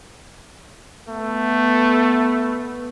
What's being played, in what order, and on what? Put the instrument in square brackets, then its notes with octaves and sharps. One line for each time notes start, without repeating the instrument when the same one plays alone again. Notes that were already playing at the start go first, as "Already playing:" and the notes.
[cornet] A3 [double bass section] B3